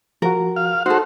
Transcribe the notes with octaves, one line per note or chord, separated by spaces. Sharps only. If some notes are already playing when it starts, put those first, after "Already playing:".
F3 F#4 A#4
F5
D#4 F#4 A4 C5